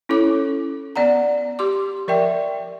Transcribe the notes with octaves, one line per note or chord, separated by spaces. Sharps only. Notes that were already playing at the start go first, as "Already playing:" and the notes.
C#4 E4 A4 C#5 D6
B3 D5 F#5 A#5
G4 C6 D6
F3 A#4 D5 E5 G5